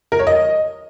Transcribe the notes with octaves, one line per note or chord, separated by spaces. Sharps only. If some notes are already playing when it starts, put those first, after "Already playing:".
A#4
C#5
D#5